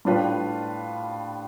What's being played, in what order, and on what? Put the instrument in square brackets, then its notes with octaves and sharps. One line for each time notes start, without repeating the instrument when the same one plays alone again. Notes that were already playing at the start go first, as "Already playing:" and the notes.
[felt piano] A2 G3 D4 F4 B4